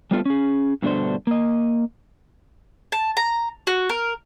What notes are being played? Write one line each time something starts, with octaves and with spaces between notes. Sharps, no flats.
G3 A3 B3 C4 F4 A4
C#4 G#4
G2 B2 D3 A3 D4 C5
A#3 D#5
A5
A#5
F#4
A#4